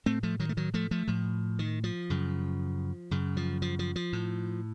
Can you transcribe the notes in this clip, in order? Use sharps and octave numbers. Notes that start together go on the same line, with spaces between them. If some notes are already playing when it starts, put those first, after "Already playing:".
A2 A3 C4
F3 A3
D#3 F#3
A3
D#3 F#3
F3 A3
F3 A3
A2 F3
D#3
F3
F#2 C#3
F#2 C#3
F3
F3
F3
F3
A2